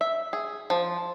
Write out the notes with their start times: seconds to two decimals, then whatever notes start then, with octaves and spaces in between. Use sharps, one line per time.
0.01 E5
0.33 G#4
0.70 F3